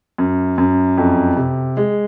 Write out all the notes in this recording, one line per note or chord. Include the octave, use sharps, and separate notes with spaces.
F#2
F#2
F2
C3
G#3